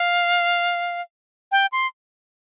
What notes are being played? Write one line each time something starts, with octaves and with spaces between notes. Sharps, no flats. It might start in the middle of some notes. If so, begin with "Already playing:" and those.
Already playing: F5
G5
C6